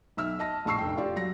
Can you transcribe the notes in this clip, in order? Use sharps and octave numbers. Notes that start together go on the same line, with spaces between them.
B1 E5 E6 F6
D#5 A5 A#6
A#1 A2 A5 C#6 E6 C7
F1 G5
F4 G4 D5 F5
F#3 A#6